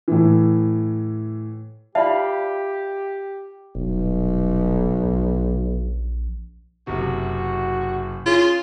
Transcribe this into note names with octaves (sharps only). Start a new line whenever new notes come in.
A2 E3
F4 G4 D5 E5 F5 A5 B5
D#1 B1
A#1
F#1 C3 F#4
C#3 F4